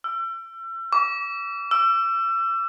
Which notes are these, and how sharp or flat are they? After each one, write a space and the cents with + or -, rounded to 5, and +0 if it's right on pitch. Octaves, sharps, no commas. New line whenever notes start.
E6 +35
D6 -35
E6 +35